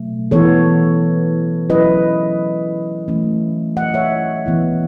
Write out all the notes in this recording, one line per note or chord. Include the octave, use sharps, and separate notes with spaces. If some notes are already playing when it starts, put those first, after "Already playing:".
Already playing: B2 F#3 A3
E3 B3 E4 A4 C#5
F#3 C#4 E4 B4 D#5
E3 A3 C#4
D#5 F#5
C#5 E5
E3 B3 E4